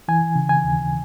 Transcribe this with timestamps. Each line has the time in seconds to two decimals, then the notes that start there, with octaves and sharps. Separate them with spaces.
0.08 E3 G#5
0.36 C#3
0.49 G#5
0.64 D#2